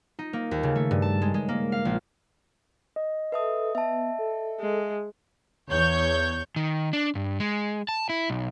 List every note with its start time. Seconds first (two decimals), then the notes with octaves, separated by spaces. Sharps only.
0.19 D#4
0.33 A#3
0.51 D#2
0.63 C#3
0.76 A3
0.91 G2
1.02 A5
1.22 G#3
1.34 G#3
1.49 A#3
1.72 F5
1.85 A#1
2.96 D#5
3.32 A4 B4 E5 D#6
3.75 B3 E5 A5
4.19 A4
4.60 G#3
5.70 E2 C#5 G6
6.56 D#3
6.93 D4
7.15 G2
7.40 G#3
7.89 A5
8.09 E4
8.30 B1